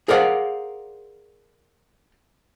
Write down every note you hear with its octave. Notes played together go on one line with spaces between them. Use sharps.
G#4 A#4 C5 D5 F5 F#5